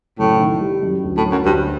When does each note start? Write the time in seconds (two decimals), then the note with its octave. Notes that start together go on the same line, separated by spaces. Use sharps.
0.19 F#1 A2
0.40 D#3
0.61 G3
0.83 F#2
1.04 D2
1.17 A2
1.25 F#3
1.31 F#2
1.45 D2 G2